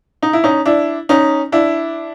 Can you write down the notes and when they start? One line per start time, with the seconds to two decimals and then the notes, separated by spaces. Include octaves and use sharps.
0.23 D#4
0.33 E4
0.44 C#4 D#4
0.66 D4 E4
1.09 C#4 D#4
1.52 D4 E4